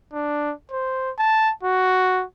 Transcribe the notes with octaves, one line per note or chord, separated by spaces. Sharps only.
D4
C5
A5
F#4